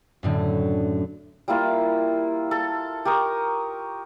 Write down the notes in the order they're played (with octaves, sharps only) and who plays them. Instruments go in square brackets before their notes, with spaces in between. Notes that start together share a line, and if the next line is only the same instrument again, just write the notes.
[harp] F#2 A2 D3
[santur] G3 A#3 E4 F4
A4
G4 A#4 C#6 D#6